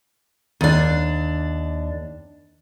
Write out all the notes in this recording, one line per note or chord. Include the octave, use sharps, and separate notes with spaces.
D#2 D4